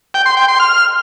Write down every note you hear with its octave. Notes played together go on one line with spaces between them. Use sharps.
G5
C6
G5
C6
F6